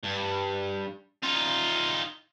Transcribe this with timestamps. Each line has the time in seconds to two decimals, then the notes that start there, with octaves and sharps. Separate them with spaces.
0.03 G2
1.23 D#4 F4